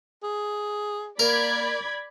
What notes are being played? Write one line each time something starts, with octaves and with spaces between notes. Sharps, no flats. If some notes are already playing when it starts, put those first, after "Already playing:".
G#4
A#3 A#4 D5 B5 G#6